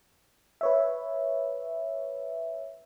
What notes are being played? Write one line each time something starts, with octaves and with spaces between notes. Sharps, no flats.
B4 C#5 E5